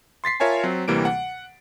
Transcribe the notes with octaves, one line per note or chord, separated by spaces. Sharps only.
C6 A6 B6 C7
F4 A#4 C#5 E5 G#5 A5
F#3 C4
D2 C3 E3 G3 A#3 D7
F#5